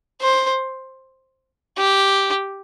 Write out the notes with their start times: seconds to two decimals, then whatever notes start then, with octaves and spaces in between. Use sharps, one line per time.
0.22 C5
1.77 G4